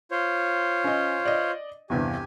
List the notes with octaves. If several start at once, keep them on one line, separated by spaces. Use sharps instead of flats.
F4 C5 C#5
C#4 D#5
D5 D#5
G1 E2 C3 G4 G#5